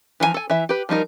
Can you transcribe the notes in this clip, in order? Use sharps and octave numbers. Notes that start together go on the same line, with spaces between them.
E3 F3 D#4 G#5 A#5
A4 G#5
E3 E5
G4 B4
F3 G3 D#4 A#4